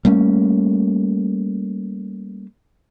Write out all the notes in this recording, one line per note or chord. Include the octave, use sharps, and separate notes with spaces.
G3 A3 A#3 C#4